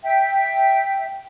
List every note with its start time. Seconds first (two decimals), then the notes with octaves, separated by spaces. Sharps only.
0.03 E5 G5